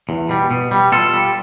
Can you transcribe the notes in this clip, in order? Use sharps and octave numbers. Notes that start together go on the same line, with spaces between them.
E2
B2 G3
B2
G3
B2 F4 A4
G3